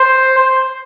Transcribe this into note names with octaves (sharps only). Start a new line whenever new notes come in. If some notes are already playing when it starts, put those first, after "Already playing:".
Already playing: C5